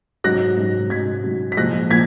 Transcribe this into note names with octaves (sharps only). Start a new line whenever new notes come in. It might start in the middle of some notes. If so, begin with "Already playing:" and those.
G#2 F#3 F#6 A#6
G#2 F#3
G#2 F#3 G#6 B6
G#2 F#3
B6
A#2 F3 G#3 F#6 A#6
A#2 F3 G#6 B6